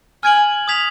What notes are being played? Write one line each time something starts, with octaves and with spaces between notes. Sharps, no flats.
G#5 F6 G#6 D7 F#7
D#6 G#6 B6 F7